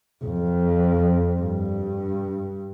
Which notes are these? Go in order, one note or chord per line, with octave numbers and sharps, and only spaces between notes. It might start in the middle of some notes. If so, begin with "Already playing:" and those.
F2
G2